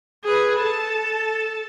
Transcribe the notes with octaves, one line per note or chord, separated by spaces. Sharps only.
G#4 B4
A4 A5